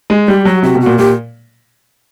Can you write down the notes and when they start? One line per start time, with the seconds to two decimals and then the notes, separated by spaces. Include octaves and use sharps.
0.10 G#3
0.28 G3 G4
0.45 F#3 F#4
0.62 C3 F#4
0.75 B2
0.81 F#4
0.86 A#2
0.98 A#2 G4